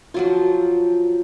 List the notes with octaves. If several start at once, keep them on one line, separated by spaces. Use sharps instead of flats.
F3 F#3 F4